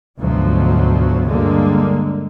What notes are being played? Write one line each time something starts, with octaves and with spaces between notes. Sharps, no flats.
D2 G#2 B2 F3 F#3
G2 D3 G#3 A#3